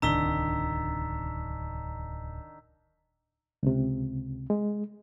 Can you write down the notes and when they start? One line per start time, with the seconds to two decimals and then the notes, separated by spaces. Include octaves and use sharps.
0.02 D1 C2 D#3 D4 A#5 E6 B6 G7
3.63 C#2 C3
4.50 G#3